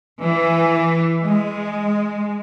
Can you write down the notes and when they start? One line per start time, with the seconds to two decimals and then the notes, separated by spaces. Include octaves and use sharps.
0.22 E3
1.23 G#3